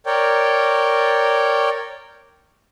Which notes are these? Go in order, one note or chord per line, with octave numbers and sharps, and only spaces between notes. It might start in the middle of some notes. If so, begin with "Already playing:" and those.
A#4 C#5 D5 G5